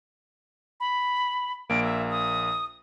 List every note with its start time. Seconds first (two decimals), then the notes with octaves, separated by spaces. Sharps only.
0.80 B5
1.70 A#1 A#3 D7
1.83 E5
2.10 D#6